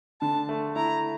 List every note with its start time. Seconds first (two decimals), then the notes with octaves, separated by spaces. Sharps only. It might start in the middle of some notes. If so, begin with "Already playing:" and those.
0.21 D3 A5
0.49 A3
0.76 E4 A#5